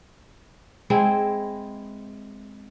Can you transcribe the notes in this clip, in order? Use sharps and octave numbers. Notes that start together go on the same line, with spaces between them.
G#3 C4 E4